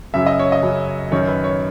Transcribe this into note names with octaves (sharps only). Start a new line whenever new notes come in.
F#2 C#3 F#3 E5
D#5
C#5
D#5
F#2 C#3 F#3
F#2 D#3 F#3 C#5
B4
C#5